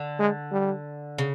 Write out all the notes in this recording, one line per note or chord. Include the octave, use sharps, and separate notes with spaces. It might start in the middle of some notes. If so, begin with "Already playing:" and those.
Already playing: D3
G#3
G3
C#3